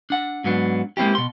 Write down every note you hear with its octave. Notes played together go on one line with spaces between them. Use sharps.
D4 F#5
G#2 F#3 B3 D4
G#3 A#3 C4 E4 G4
B2 C6